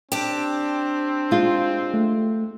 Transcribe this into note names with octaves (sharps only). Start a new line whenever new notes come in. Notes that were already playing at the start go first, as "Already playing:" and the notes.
C4 D4 G4
G#3 F4
A3